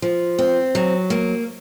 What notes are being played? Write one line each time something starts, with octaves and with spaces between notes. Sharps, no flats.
F3
C4
F#3
A#3